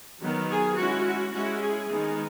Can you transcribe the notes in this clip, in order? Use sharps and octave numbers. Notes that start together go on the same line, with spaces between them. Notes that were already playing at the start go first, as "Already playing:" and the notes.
D#3 F#3 B3
G#4
G#3 C#4 E4 F#4
F#4
G#3 C#4 E4 F#4
G#4
D#3 G#3 B3 D#4